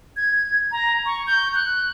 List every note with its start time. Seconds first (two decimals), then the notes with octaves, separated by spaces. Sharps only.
0.16 G#6
0.71 A#5
1.06 C#6
1.27 G6
1.55 F#6